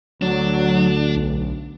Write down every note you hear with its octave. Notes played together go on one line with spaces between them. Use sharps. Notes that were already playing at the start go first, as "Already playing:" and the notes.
D2 F#3 D4
B1